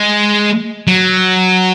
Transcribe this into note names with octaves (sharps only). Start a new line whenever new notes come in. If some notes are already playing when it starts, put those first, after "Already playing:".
Already playing: G#3
F#3